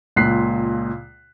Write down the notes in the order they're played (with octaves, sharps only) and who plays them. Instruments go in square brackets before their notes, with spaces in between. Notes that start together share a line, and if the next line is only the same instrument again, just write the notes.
[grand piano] C#2 A#2 F#6 B6 C7